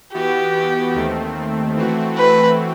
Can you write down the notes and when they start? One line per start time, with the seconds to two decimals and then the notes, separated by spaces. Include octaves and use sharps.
0.14 E3 B3 F#4 G4
0.95 D#2 D#3 A3 C4
1.77 E3 A3 C4 F#4
2.17 B4